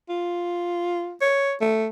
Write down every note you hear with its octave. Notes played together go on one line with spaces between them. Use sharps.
F4
C#5
A3